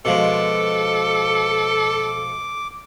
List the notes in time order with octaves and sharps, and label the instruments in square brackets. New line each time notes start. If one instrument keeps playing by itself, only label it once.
[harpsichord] B2 F3 G#3 [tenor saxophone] A4 [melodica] D6